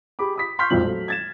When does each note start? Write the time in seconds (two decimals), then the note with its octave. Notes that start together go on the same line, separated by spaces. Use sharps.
0.19 G4 G#4 B5 D6
0.36 B5 D#6 B6
0.59 C6 C#6 F6 G6 B6
0.70 E1 B1 F2 A#2 F#7
0.83 F#3 A3
1.08 G#6 A6 E7